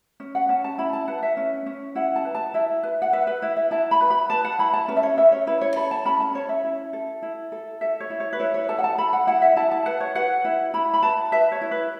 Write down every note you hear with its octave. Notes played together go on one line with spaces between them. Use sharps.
C#4
F#5
C#4 A5
A5
E4 B5
A5
B4 F#5
E5
C#4
C#4
E4 F#5
A5
B4
A5
E4 E5
B4
F#5
B4 E5
B4
E4 E5
E5
E4 A5
B5
B4
B5
B4 A5
F#5
E4 B5
A5
C#4 B4
E5
C#5
C#4 E5
C#5
E4 B4
C#5
A4 B5
A5
C#4 B5
A5
C#4 C#5
E5
E4
A4
E4
A4
A4 E5
C#5
E4
C#5
B4
E4 C#5
C#5
A4 A5
F#5
A5
A4 B5
F#5
E4 F#5
E5
E4 A5
A5
B4 F#5
C#5
B4 F#5
E4
E4 B5
B5
B4 A5
B4 E5
C#5
E4
B4